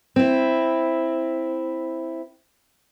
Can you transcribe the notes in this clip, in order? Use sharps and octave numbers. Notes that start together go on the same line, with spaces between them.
C4 E4